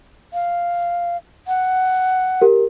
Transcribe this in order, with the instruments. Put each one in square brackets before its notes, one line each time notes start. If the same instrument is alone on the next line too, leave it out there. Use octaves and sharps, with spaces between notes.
[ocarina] F5
F#5
[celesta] G4 A#4